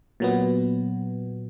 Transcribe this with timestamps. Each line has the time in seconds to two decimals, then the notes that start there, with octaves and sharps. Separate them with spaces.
0.20 A#2 F#3 B3